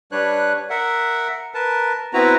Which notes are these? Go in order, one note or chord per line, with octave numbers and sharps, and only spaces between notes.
G3 D4 B4 C#5 F#6
A#4 E5 F#5
A#4 B4 A5
B3 C4 E4 F#4 B4 A#5